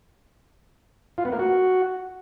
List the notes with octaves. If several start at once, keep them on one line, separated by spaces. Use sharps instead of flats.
F4
B3
A#3
F#4